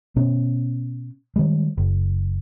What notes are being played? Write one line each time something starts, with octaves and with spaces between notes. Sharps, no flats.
B2 B3 C#4
D#3 G3 G#3
F#1